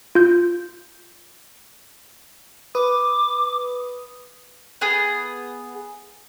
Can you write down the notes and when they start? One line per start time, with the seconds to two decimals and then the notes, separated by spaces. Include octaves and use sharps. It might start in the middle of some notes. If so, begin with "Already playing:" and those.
0.15 F4 G6
2.75 B4 D6 D#6
4.81 B3 G#4